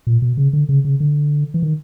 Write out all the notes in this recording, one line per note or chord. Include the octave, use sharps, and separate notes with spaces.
A#2
B2
C#3
D3
C#3
C#3
D3
E3
D#3